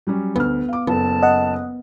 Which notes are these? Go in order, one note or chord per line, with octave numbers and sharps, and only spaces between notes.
F#3 G3 C#4
D2 B3 F6
F5 D6
F#1 B3 A4 A5
D#5 F#5